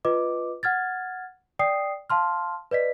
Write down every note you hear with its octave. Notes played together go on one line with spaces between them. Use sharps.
F4 B4 D#5 D6
F#5 F6 G#6 A6
D5 G5 D#6 C7
F5 A5 C6 F6
B4 D5 D#5 B6